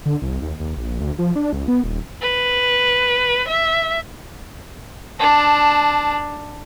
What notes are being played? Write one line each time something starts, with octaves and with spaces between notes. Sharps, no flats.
D3
C2
D#2
D#2
A#1
D2
F3
D4
C#2
B3
D#1
B4
E5
D4 A5